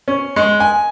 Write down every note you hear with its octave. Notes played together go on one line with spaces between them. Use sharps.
C#4
G#3
G#5